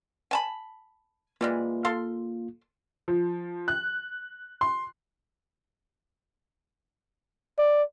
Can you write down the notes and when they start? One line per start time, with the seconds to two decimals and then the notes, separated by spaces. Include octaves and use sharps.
0.31 G#5 A5 B5
1.41 E3 G3 G#3 A#3 F4
1.85 A4 F5 C6
3.08 F3
3.68 F#6
4.61 C6
7.59 D5